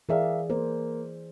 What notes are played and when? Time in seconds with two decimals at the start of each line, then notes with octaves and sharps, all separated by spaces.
0.09 E3 G#4 A#4 D5 E5 F5
0.50 A#3 C5